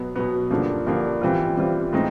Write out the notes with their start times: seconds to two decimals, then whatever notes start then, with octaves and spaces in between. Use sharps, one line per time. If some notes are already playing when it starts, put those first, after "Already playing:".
Already playing: B2 F#3 B3
0.16 B2 F#3 B3
0.50 G2 D3 F3 A#3
0.87 G2 D3 F3 A#3
1.21 E3 G3 C4 F4
1.57 E3 G3 C4 F4
1.93 A2 E3 G#3 C4 D#4